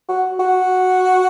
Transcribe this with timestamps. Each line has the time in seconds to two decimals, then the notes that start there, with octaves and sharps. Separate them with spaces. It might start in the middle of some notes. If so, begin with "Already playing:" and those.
0.09 F#4
0.39 F#4